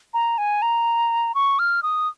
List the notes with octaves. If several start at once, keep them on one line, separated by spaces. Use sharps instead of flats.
A#5
G#5
A#5
C#6
F6
D#6